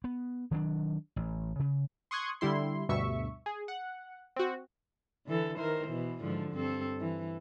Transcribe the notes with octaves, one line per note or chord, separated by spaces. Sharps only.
B3
D#3 F#3 A#3 D4
A1
C#3
C6 C#6 D#6 F#6 G#6
D3 G3 E4 C6
D2 G2 B2 E5 C#6
G#4
F#5
C4 F#4
D3 E3 A4
D#3 A#4 C5
B2 E3
G#2 D3 F3
G2 C4 A4
E3